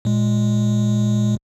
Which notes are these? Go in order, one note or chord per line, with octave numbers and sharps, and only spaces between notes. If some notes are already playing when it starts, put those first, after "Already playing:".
A#2 G#3